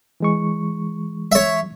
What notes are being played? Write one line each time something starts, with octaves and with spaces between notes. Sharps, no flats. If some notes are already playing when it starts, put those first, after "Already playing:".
E3 G#3 C#6
C#5 E5